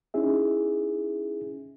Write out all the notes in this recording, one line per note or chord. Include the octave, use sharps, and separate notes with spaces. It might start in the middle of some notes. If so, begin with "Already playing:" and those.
C#4 D#4 E4 G#4 E5